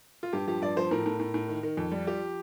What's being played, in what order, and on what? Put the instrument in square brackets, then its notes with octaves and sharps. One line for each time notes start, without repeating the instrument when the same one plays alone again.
[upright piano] F4
G2 G4
F3 G4
G2 D5
F3 C5
A2 A#4
A2
A2
A2
D#3
D#3
F2
G3
F3 G4